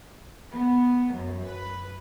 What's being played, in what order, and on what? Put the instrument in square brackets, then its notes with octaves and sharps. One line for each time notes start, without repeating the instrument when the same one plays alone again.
[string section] B3
F#2
B4